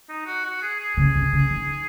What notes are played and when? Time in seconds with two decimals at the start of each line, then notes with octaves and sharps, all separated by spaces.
0.09 D#4
0.26 F#4
0.44 F#4
0.62 G#4
0.80 G#4
0.97 C#3
1.15 C3
1.33 C#3
1.50 D#3